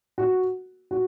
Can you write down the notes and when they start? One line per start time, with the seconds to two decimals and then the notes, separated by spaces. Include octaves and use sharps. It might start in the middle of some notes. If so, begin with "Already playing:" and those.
0.18 F#4
0.91 F#4